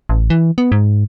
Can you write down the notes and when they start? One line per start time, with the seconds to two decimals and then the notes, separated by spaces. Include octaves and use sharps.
0.09 A1
0.30 E3
0.58 B3
0.72 G#2